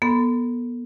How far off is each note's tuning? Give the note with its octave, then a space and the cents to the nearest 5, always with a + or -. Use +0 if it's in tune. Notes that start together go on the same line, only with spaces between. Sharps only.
B3 -30 A4 +15 C6 -45